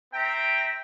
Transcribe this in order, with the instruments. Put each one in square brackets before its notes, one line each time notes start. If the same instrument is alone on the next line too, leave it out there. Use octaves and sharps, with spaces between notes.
[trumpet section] C4 E5 G5 A#5